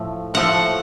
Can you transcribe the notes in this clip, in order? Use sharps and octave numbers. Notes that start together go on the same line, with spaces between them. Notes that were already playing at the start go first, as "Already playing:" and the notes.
Already playing: A2 F3 A3
A2 F3 A3 F#5